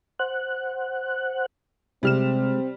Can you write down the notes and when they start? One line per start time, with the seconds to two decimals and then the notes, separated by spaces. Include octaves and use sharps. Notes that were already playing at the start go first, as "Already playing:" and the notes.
0.19 C5 F#5 F#6
2.03 C3 G3 G#3 C4 F6 E7